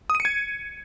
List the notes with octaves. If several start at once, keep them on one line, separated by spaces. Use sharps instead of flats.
D#6
D#7
C#7
G#6